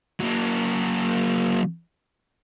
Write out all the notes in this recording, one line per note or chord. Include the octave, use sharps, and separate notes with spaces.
F#3 A#3